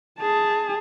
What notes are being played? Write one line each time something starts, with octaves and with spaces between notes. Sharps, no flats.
G#4 A5